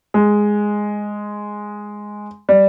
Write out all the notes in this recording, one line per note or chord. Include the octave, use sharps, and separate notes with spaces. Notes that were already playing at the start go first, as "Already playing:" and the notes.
G#3
G3